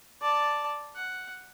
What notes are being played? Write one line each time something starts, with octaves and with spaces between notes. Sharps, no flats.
D5 A5
F#5